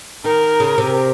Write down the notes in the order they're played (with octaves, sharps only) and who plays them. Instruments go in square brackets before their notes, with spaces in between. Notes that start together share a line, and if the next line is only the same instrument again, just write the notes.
[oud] D#3 [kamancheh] A#4
[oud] C#3
C3